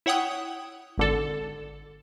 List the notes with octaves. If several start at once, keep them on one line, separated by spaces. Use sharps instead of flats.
E4 C#5 F#5 G5 D#6
G#1 D3 A4